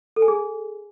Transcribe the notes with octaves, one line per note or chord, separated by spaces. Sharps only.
A4
G#5
G#4